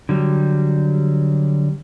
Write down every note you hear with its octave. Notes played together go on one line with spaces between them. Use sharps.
D3 F#3 G3